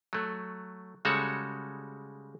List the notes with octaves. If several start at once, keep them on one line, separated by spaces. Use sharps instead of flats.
F#3 A3
C#3 G3 G#3 F#4 A4 C#5